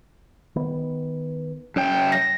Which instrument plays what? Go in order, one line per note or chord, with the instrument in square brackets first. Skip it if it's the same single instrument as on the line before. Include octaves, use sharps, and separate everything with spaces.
[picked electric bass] D#3 B3
[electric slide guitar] F#2 G5 [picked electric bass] C#4
[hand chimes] A#6